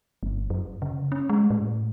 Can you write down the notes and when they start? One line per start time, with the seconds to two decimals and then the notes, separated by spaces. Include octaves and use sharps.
0.23 G1
0.50 F#2
0.82 C#3
1.12 C#4
1.29 G#3
1.50 A2